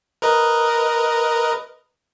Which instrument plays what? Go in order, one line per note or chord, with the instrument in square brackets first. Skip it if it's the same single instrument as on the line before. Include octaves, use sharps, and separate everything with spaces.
[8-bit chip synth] A#4 B4 D#5